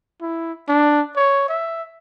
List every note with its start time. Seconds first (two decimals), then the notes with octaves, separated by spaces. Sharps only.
0.22 E4
0.69 D4
1.16 C#5
1.49 E5